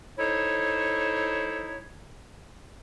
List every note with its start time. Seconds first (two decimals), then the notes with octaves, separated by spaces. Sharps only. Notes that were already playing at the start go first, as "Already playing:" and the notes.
0.18 D#4 E4 A4 C5 C#5